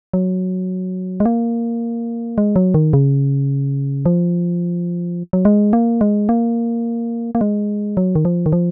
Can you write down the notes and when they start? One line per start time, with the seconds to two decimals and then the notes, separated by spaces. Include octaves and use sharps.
0.14 F#3
1.20 G#3
1.26 A#3
2.38 G#3
2.56 F#3
2.74 D#3
2.93 C#3
4.06 F3
5.33 F#3
5.45 G#3
5.73 A#3
6.01 G#3
6.29 A#3
7.35 A#3
7.41 G#3
7.97 F#3
8.15 D#3
8.25 F3
8.46 D#3
8.53 F3